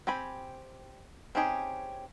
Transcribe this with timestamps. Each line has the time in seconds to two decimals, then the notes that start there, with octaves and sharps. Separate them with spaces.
0.07 C4 G4 G#5 B5
1.35 C4 C#4 D#4 G4 G#4